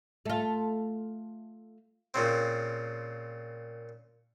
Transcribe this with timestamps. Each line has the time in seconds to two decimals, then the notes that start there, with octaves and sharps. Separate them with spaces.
0.25 A3 F4
2.14 A#2 C#3 C4